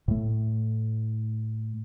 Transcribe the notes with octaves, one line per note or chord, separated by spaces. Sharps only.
A2 A3